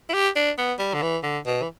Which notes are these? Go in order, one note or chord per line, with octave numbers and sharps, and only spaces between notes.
E4
G4
D4
B3
G3
D3
E3
D3
B2
E3